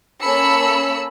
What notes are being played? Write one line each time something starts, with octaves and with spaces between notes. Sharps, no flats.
A#3 C#4 A4 B5 E6 C#7